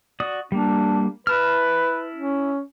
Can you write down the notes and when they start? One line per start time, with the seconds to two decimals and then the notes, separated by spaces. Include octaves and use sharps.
0.20 F#4 D5 D#6
0.52 G3 A#3 D4
1.27 E4 B4 A5 F6
2.15 C#4